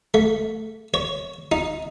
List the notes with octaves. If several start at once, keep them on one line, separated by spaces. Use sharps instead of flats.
A3
C#5
D#4